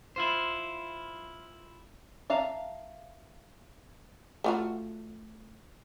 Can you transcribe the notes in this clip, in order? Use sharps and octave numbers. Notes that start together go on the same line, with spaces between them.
E4 F4 C5
E5 F5 A5 A#5
A3 F4 F#4